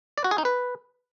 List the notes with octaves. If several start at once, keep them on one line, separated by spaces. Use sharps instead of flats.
D5
F#4
G#4
D#4
B4